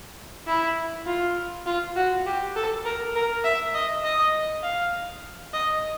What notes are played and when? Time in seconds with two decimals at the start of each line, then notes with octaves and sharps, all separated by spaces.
0.47 E4
1.06 F4
1.66 F4
1.96 F#4
2.26 G4
2.56 A4
2.85 A#4
3.15 A#4
3.44 E5
3.74 D#5
4.04 D#5
4.63 F5
5.53 D#5